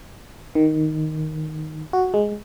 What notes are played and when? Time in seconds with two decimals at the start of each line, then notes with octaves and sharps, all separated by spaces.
0.55 D#3
1.93 F#4
2.14 G#3